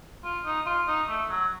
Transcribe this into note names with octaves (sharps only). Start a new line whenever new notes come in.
F4
D#4
F4
D#4
A3
F#3